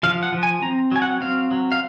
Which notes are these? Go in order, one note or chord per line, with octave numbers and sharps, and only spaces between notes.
F3 F5
F#5
F3
G#5
C4 A#5
F#3 G#5
F#5
C4 F5
F#3
F5